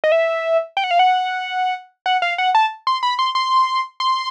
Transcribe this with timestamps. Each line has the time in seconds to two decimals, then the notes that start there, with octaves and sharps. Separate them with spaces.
0.04 D#5
0.12 E5
0.77 G5
0.84 F#5
0.91 F5
0.99 F#5
2.06 F#5
2.22 F5
2.38 F#5
2.55 A5
2.87 C6
3.03 B5
3.19 C6
3.35 C6
4.00 C6